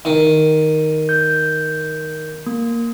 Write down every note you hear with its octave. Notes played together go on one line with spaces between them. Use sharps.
D#3
G6
A#3